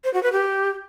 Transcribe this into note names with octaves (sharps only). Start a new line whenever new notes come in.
C5
F#4
B4
G4